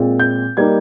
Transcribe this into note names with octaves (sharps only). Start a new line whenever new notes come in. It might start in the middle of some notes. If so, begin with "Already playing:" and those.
Already playing: A#2 G#3 C4 F4
G6
G3 A#3 D#4 G#6